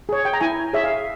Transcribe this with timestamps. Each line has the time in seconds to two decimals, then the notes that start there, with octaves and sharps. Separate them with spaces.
0.09 G#4 C#5
0.25 G5
0.33 A#5
0.41 E4 G#5
0.73 G#4 C#5 E5
0.84 F5